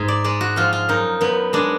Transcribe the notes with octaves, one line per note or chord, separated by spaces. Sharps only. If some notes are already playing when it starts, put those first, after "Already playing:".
Already playing: G#2
D5
G#3 D5
F#4
F3 F4
F4
F#2 D#4
F#2 B3
G#3 D4